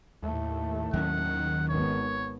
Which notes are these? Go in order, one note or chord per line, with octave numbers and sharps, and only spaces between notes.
D#2 A2 A3
D#2 D#3 F#3 C#4 F#5
G#1 B3 C#5